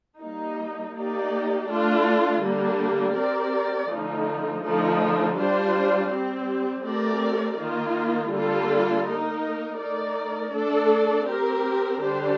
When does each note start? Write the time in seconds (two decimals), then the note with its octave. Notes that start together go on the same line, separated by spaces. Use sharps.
0.21 G3 A#3 D#4
0.94 A#3 D#4 G4 D5
1.68 A3 D4 F4
2.41 D3 G3 A#3 D4
3.15 C4 G4 A#4 D5
3.89 D3 F3 A3 D#4
4.62 D3 F3 A3 D#4
5.36 G3 D4 F4 C5
6.09 G3 C4 G4
6.83 A3 C4 G4 A#4 D5
7.57 D#3 A#3 F4
8.31 D3 G3 A#3 F4 A4
9.04 A#3 D#4 A#4
9.78 A3 D#4 A#4 D5
10.52 A3 D4 A4 D5
11.26 C4 G4 A#4
11.99 D3 G3 D4 G4 C5